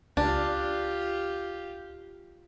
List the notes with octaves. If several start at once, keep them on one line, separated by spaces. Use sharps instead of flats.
C#2 D4 F4 G4